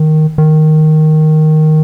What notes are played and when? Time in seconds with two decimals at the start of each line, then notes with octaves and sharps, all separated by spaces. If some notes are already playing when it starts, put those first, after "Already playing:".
Already playing: D#3
0.38 D#3